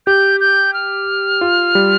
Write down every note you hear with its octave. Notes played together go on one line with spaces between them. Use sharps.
G4 G6
G6
F6
F4
G3